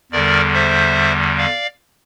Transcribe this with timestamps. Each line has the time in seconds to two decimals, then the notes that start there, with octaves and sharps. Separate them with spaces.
0.12 E2 D3 G3 A#4 D5
0.54 C5 E5
1.37 D5 F5